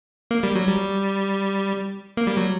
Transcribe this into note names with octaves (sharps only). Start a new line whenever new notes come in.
A#3
G3
F#3
G3
A#3
G3
F#3